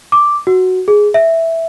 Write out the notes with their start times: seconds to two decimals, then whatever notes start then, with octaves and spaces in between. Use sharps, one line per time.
0.12 D6
0.47 F#4
0.88 G#4
1.14 E5